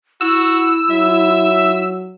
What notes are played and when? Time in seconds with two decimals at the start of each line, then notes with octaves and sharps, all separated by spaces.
0.21 E4 F#4 E6
0.91 F#3 E5